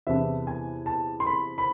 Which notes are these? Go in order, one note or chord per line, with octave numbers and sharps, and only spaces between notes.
E2 C3 E3 B3 D4 E5
G#5
A5
C6
B5
B5